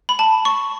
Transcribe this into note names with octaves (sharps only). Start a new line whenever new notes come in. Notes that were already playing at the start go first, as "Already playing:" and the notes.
B5
A5
C#6